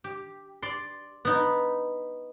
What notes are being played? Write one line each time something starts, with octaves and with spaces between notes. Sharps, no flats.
G4
D5 C6
B3 D#4